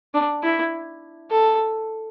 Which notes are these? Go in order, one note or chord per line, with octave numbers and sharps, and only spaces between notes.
D4
E4
A4